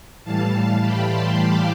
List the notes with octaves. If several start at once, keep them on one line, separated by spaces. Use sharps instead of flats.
A2 E3 G3 F5 A5
F5 A5
G5 B5
A5 C6
B5 D6